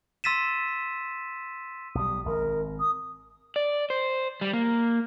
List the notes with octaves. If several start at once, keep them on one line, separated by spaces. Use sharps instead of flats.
C6 E6 A6 B6 D#7 E7
B1 G3 D#6
G#1 A#4
D#6
D5
C5
G3
A#3